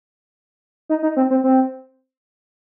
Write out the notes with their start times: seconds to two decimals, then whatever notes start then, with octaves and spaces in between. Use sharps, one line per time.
0.89 D#4
1.03 D#4
1.16 C4
1.30 C4
1.44 C4